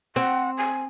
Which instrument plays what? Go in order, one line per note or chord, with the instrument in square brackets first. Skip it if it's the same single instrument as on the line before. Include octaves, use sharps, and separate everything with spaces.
[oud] C4 [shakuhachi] F#5
[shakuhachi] G#5